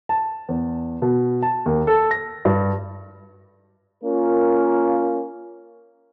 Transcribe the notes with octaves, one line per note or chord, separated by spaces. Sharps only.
A5
E2
B2
A5
D#2
A4
A#6
G2
A#3 C#4 F4 A#4